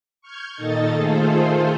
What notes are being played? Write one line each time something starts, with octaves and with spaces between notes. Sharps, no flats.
C#6 F6 G6 G#6
A#2 D#3 D#4 A4 D#5 A6
D#3 A3 F4 G#4 A4 C5